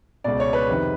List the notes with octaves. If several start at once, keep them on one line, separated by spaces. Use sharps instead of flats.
C#2 B2 D5
C#5
B4
F2 C3 D#3